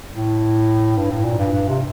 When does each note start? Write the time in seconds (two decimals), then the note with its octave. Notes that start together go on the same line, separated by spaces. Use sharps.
0.15 A2
0.97 G2
1.11 A2
1.25 A#2
1.39 G2
1.53 G2
1.69 C3